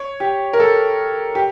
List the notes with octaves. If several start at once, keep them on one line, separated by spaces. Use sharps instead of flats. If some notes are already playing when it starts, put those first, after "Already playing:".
Already playing: C#5
G4
A#4
A4
G4